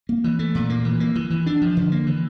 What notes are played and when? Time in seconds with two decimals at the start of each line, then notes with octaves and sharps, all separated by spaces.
0.09 A#3
0.24 E3
0.39 A3
0.55 A#2
0.70 A#3
0.85 E3
1.00 A#3
1.15 E3
1.30 E3
1.46 D4
1.61 F3
1.77 D3
1.92 A#3
2.07 E3